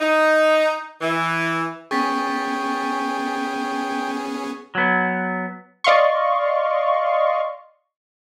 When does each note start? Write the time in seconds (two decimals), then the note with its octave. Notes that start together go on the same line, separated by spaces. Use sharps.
0.01 D#4
1.01 E3
1.91 B3 C#4 G#4 G5 C#6 A6 B6
4.75 F#3 B3
5.84 D5 D#5 F5 C6 C#6